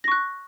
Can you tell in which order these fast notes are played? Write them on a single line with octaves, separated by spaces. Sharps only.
A#6 C#6 F#6